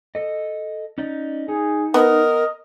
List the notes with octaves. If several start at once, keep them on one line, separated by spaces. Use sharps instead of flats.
A4 D#5
C#4 D#4 D5
D#4 G#4
B3 A#4 D#5